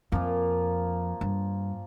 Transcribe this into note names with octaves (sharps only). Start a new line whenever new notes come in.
F2 A#2 F3 A#3 F4
G2